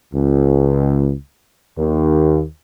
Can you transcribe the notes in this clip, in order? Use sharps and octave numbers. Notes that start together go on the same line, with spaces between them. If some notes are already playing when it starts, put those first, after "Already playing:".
C#2
D#2